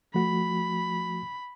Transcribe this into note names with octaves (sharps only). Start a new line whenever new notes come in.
F3 A3 F#4 B5